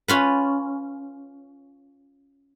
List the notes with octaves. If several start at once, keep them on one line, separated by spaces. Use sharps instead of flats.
C#4 F4 B4